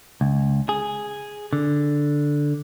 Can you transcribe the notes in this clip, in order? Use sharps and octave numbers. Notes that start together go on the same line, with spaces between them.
C#2
G#4
D3